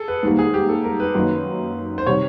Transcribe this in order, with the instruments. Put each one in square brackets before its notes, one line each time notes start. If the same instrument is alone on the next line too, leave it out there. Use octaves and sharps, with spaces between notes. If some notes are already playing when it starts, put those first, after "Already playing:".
Already playing: [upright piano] G#4 A4
B4
[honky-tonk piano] G#2 D#3 G3 A#3
[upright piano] G#4
G4
A4
A#4
B4
[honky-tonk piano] F#2 D#3 F#3 A#3 D#4
[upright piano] C5
[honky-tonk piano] C3 D#3 G3 [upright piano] C#5